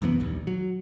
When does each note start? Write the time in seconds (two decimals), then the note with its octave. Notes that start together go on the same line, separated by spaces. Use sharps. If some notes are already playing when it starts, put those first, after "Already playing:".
0.02 C2 F#2 E3 B3
0.20 D#1 A#1 D#2
0.47 F#3